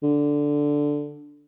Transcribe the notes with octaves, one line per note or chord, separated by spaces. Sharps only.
D3